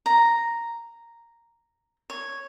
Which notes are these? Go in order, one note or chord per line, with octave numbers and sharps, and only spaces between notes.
A#5
C#5